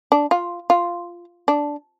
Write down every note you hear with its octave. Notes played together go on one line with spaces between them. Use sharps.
D4
F4
F4
D4